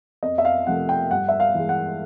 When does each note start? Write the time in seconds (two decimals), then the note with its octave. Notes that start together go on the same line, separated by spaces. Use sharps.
0.23 F2 D#5
0.38 E5
0.45 F5
0.67 C3 F3 A3 F#5
0.89 G5
1.11 G2 F#5
1.29 E5
1.40 F5
1.55 E3 G#3
1.69 F#5